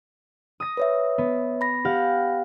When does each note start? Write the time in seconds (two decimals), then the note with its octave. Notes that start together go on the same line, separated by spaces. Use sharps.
0.60 D#6 A#6
0.77 B4 C#5 E5
1.18 B3
1.61 B5 A#6
1.85 G4 F5 F#5